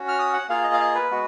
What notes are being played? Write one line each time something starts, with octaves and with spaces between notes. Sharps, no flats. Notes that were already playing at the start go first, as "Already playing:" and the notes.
Already playing: C#4 F#4
F6
D#6
F#5
A#3 F4 G#4 F5
D#5
F5
D#5
B4
G#3 B3 F#4